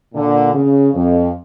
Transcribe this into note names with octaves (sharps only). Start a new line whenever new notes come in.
A#2 D3
C#3
F2